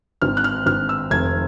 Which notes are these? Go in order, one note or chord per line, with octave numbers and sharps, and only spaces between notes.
G#1 F6
F#6
F6
G#1 F6
E6
F1 G#6